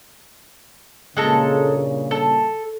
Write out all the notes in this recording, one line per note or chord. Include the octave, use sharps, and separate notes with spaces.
G2 A#2 C#3 G#3 A4 A#5
A4